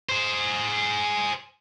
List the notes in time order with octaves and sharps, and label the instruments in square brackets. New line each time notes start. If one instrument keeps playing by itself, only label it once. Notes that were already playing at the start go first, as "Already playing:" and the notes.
[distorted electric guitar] G#4 C5